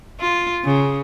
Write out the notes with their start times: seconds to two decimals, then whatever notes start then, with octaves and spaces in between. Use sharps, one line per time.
0.20 F4
0.64 C#3